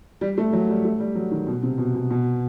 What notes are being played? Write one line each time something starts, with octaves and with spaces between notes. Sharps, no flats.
G3
A3
F#3
G3
A3
G3
F#3
D#3
B2
C3
B2
B2
B2